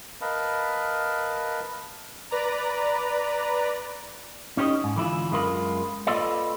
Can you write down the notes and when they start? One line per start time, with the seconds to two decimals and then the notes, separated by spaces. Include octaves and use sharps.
0.21 A#4 B4 D#5 F5 A5 B5
2.31 B4 D5 A#5
4.57 C#4 D#4 G4 C5 D#5
4.84 G#2
4.96 D3 E3 E4 F4
5.31 F#2 G3 G#3 F4 A#4 B5
6.07 A#3 F4 A4 B4 D5 D#5